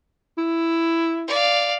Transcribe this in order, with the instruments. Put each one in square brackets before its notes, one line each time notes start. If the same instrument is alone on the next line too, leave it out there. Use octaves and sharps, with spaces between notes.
[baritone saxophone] E4
[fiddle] D5 F5